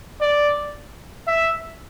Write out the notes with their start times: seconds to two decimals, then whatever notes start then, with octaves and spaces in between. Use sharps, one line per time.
0.21 D5
1.27 E5